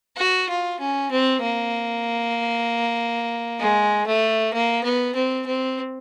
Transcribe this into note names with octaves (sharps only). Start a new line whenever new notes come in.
F#4
F4
C#4
C4
A#3
G#3
A3
A#3
B3
C4
C4